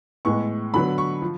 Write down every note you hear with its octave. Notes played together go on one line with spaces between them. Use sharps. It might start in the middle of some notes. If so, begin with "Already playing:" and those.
A2 G#3 B3 C#6
D3 F#3 B3 B5
C#6
F3